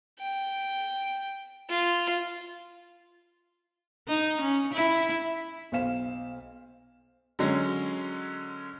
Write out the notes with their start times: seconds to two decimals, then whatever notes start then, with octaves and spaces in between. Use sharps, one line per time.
0.20 G5
1.69 F4
4.08 D#4
4.42 C#4
4.73 E4
5.72 B1 C5 F5 E7
7.39 D3 F#3 G#3 C#4